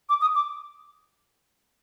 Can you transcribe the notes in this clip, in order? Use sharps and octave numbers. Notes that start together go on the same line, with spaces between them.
D6
D#6
D6